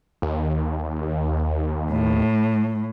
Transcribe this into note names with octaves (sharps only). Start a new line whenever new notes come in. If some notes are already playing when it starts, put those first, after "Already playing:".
D#2
A2